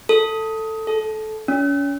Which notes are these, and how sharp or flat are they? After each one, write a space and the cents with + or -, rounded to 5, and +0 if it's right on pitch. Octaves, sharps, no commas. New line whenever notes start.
A4 +10
A4 -20
C#4 +35